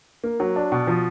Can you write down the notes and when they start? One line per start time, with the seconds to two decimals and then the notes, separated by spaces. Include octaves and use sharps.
0.24 A#3
0.40 F#3
0.56 D4
0.72 B2
0.87 F3